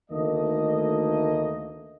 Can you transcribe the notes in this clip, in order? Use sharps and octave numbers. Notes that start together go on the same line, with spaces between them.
D2 D#3 A3 A#3 D#5